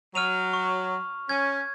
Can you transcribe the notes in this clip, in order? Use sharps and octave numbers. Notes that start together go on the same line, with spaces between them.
F#3 F6 D#7 F7
C#6
C#4 G#6